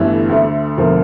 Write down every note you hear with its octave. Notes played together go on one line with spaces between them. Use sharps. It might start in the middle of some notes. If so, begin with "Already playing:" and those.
Already playing: G1 G2 E3 A3
D2 D3 A3
E1 D2 D3 F3 A#3